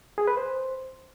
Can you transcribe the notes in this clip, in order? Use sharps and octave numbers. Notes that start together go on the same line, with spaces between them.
G#4
B4
C5